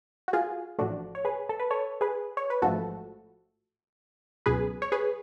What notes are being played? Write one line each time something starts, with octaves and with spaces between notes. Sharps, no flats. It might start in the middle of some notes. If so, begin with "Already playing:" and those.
F#4
F4 G#4
A1 A2 F3 A3 D4 F#4
C#5
G#4 B4
A4
B4
A4 C#5
G#4 B4
C#5
B4
A1 G#2 F3 A3 F#4 A4
C#2 B2 F#3 G#4 B4
C#5
G#4 B4